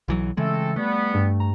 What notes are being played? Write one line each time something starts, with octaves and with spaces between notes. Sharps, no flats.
B1 E3 F#3
C#3 E3 G#3 A3 C4 A4
G3 A3 B3
G2
A#5